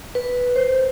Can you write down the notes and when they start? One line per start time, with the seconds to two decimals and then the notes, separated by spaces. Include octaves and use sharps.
0.15 B4
0.56 C5